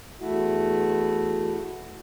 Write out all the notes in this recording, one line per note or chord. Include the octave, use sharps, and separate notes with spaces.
E2 A3 E4 F#4